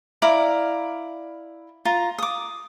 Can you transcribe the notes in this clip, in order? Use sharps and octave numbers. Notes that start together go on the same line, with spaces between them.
E4 D5 F5 A#5
F4 A#5
D6 D#6